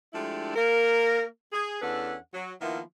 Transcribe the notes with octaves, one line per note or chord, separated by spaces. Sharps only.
F3 G#3 A3 D4 E4 G4
A#3 A#4
G#4
E2 C#4 D4 A4 B4 F#5
F#3
D#3 F3 A#3 B3 E4